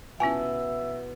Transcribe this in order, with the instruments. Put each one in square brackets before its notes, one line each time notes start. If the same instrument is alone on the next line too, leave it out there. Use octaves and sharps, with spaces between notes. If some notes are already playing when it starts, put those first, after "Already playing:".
[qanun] B2 E4 [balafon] C#4 F4 A5 [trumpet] E5 [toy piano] G#5